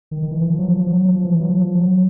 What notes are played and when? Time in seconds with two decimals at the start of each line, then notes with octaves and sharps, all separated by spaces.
0.11 D#3
0.22 D#3
0.31 E3
0.41 E3
0.50 F3
0.59 F#3
0.69 F3
0.87 F#3
1.05 F3
1.25 E3
1.40 F#3
1.49 F3
1.75 F#3